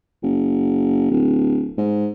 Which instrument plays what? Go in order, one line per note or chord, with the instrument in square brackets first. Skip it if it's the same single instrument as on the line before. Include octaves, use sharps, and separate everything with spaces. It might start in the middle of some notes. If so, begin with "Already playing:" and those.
[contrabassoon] F#1
D1
G#2